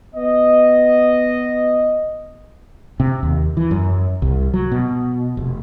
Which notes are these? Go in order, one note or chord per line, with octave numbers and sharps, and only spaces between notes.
B3 D#5
C3
D#2
E3
F#2
C2
F#3
B2
F1